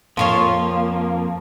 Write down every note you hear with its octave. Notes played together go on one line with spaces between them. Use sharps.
F2 F3 A#3 F4 C#5